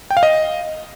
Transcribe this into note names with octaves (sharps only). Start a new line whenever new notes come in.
G5
F5
D#5